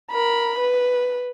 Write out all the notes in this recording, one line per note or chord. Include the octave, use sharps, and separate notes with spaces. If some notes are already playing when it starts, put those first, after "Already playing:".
A#4 B5
B4